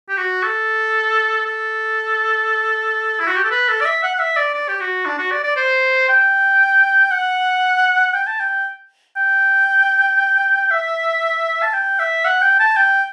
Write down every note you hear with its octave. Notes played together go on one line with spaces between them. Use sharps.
G4
F#4
A4
A4
E4
F#4
G4
A4
B4
A4
D5
E5
F#5
F#5
E5
D5
D5
G4
F#4
D4
F#4
D5
D5
C5
G5
F#5
G5
A5
G5
G5
E5
A5
G5
E5
F#5
G5
A5
G5